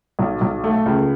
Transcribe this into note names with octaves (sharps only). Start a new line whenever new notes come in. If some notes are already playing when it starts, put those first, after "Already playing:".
B1
B1
A3
C#2